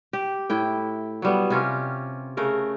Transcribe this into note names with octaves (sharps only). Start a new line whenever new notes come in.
G4
A2 E4 G5
F#3 G3 B3
C3 C#4 F4 G4
C#3 A3 A#4